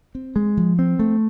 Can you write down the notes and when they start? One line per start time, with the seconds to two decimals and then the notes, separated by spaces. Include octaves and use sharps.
0.15 C4
0.36 G#3
0.57 F3
0.79 C4
0.99 A3